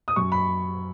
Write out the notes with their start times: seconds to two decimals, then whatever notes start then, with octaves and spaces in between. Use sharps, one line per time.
0.08 D#6
0.16 F#2 C#6
0.32 B5